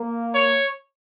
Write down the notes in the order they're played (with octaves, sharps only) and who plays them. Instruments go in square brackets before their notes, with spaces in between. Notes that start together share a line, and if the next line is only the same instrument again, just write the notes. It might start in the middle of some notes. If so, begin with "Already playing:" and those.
Already playing: [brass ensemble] A#3
[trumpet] C#5